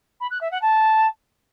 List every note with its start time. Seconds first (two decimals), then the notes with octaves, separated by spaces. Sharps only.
0.20 B5
0.31 F#6
0.41 E5
0.51 F#5
0.62 A5